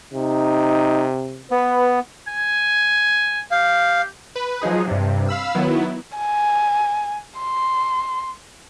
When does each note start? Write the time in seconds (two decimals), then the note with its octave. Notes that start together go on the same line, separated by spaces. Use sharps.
0.13 C3 D#4
1.51 B3 B4
2.28 G#5
3.52 G4 F5
4.35 B4
4.61 F3 F#3 G#3 D#4 G#4
4.87 G2 C3
5.29 F5 B5 E6
5.55 D#3 F#3 B3 E4
6.17 G#5
7.40 C6